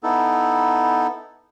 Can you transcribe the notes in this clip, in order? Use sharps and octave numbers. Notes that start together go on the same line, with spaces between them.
B3 D#4 E4 A4